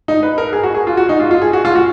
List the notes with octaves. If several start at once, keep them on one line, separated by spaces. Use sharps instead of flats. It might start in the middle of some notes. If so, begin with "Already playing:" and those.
D#4
B4
A#4
G#4
F#4
G#4
F4
F#4
D#4
F4
F4
G#4
F#4
F4
F#4